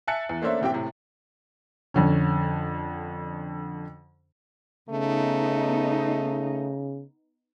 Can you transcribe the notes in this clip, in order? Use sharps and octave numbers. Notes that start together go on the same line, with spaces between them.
E5 G#5 A5 F#6 A6 C#7
E2
A3 A#3 C#4 D4 C5 E5
E1 A2 C4 G4 E5 G5
A2 C3
F2 D3 C#4
C#3 A3 B3 D#4